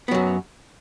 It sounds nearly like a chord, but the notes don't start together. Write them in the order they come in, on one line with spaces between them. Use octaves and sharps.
B3 F#3 F#2